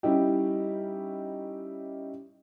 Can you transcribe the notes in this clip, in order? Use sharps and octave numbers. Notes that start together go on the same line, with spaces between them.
G3 C#4 D#4 E4 G4